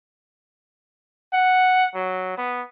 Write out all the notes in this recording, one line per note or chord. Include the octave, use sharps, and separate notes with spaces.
F#5
F#3
B3